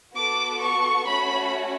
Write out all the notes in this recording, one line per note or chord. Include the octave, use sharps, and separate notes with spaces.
B3 F#4 A4 D6
C#6
A3 C#4 F#4 B5